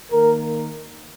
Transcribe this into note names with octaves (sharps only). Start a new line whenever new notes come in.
D#3 A#3 A#4